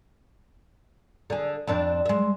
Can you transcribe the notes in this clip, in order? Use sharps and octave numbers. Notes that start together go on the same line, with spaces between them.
D3 G#4
F2 C4 D4
G#3 E5